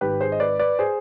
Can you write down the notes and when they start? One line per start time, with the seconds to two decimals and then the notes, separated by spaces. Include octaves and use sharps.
0.01 G#1 G#2 D#3 G4 B4
0.20 G#4 C5
0.32 D#5
0.40 B4 D5
0.59 B4 D5
0.79 G#4 C5